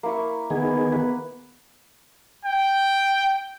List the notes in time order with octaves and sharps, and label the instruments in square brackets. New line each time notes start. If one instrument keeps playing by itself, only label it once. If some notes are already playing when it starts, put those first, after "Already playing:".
[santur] A#3 E4 C#6
[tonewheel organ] D#3 G#4 [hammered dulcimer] B3
[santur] B4
[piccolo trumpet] G5